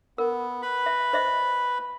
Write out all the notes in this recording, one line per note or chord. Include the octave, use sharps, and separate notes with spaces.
B3 A#4
B4 B5
E5
C5 D#5 E5